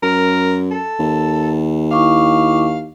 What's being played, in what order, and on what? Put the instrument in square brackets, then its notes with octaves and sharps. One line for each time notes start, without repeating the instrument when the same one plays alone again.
[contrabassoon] F#2 [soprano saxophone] A#4
[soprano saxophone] A4
[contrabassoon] D#2
[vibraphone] E4 C#6 D6 [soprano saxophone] F5